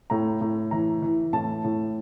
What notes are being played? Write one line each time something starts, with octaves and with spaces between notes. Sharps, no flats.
A2 A#5
A2
E3 A#5
E3
A2 A5
A2